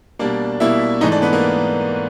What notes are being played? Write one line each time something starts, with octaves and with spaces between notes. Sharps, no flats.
B2 G3 A#3 D4 D5
B2 G3 A#3 E4 E5
G#2 E3 A3 D#4 D#5
D4 D5
B3 B4
A#3 A#4